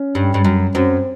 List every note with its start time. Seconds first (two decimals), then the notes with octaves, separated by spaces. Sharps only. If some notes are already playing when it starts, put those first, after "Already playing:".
Already playing: C#4
0.15 G2
0.34 G2
0.45 F#2
0.75 F#2 C4